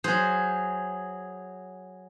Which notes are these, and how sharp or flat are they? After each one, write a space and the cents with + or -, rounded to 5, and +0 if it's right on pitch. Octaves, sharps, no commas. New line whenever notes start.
F#3 +0 G#4 +0 C5 +0